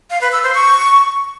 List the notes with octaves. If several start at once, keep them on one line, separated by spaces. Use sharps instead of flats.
F5
B4
E6
C5
C#6